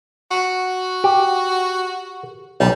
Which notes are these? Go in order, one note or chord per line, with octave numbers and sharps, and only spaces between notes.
F#4
G4
B1 G3